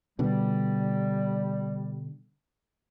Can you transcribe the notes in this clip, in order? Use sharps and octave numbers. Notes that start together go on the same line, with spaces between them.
B2 D3 G3